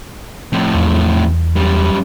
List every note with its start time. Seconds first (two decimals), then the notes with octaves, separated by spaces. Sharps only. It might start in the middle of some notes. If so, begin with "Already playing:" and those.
0.53 F2 A2
0.75 E2
1.56 F#2 G3